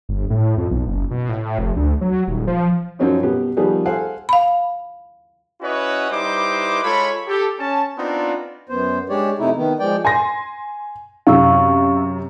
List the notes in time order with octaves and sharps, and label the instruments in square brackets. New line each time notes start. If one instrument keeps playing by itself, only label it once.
[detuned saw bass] G1
A2
F2
B1
F#1
B2
A2
F1
D2
F#3
D#1
F3
[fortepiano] F#2 F3 F#3 C4 C#4 D#4
B2 B3 G4
D#3 F3 G3 B3 G4 G#4
A4 C5 F5 F#5 G#5
[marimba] F5 B5
[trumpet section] C#4 E4 F#4 B4 C#5 D#5
G3 D#4 E4 B4 C5 D6
G#3 F4 A4 C#5 B5
G4 A4
C#4 A5
B3 C4 D4 D#4 F4
[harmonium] F#2 B3 C5
G#3 D4 G4 C#5 D5
F2 C3 A3 D#4 E4
D#3 B3
F3 G#3 D5 G5
[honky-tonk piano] G#5 C6 A#6
[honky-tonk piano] F#2 C3 [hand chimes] F5 C#6 E6